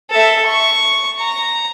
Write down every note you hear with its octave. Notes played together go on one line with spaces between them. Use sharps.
A4 E5
C#6
A#5